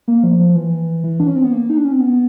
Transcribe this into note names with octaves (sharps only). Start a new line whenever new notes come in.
A#3
F3
F3
E3
E3
D4
C#4
C4
B3
A#3
D#4
D4
C#4
C4
B3